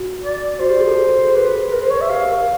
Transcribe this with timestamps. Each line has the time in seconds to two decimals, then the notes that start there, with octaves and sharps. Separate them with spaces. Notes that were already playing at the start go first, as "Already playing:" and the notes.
Already playing: F#4
0.23 D5
0.59 F#4 C5
0.70 G4
0.79 G#4
0.87 A4
1.35 G#4 B4
1.73 A#4
1.81 C5
1.91 C#5
2.01 E5
2.09 G4 F5
2.29 A#4